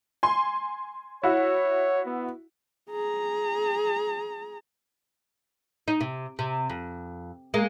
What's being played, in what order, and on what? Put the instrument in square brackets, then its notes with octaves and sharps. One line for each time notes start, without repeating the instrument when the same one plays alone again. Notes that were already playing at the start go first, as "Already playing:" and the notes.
[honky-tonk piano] G#5 C6
[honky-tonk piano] E4 F#4 [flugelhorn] C#5
[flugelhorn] B3
[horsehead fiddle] G#4 A#5
[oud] D#4
C3
C3
F2
G#3 A#3